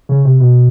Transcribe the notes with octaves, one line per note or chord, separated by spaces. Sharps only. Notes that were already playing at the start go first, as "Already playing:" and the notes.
C#3
C3
B2